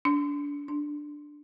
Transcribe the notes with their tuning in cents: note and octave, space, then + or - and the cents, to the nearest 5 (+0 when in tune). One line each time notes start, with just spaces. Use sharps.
D4 -30
D4 +5